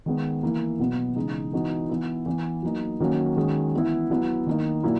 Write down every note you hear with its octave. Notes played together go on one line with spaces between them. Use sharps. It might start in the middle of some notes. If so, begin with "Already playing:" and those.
D#3 G#3 B3
E3 A#3 E4
B2 F#3 B3
C#3 E3 G#3 D#4
E3 B3 D#4 F#4
E3 B3 E4
E3 B3 E4
F#3 A#3 D#4
D#3 F#3 A#3 C#4 F#4
D#3 G#3 C#4 F#4
E3 B3 E4
F#3 B3 E4
D#3 A#3 D#4
A#2 F#3 A#3 E4